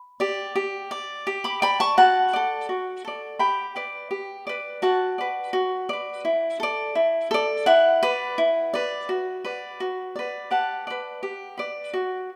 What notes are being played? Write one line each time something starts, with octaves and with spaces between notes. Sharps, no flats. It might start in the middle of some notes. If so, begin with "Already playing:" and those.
Already playing: B5
G4 D5
G4
D5
G4
B5 D6
D5 G5 B5
A5 C#6
F#4 F#5 A5
A4 D5
F#4
A4 D5
G4 G5 B5
B4 D5
G4
B4 D5
F#4 F#5 A5
B4 D5
F#4
B4 D5
E4
A4 D5
E4
A4 D5
E4 F#5
B4 D5
E4
B4 D5
F#4
B4 D5
F#4
B4 D5
G4 F#5 A5
B4 D5
G4
B4 D5
F#4